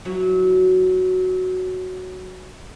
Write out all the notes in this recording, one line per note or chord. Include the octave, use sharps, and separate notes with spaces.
F#3 E4 F#4